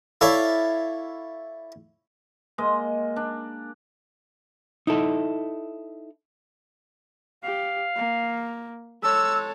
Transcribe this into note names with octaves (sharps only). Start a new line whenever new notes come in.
E4 A4 C#5 D5 F5
G#3 A#3 D#5
D4
D#4 E4 A4
G4 F5
A#3
G#3 A4 C#5 E6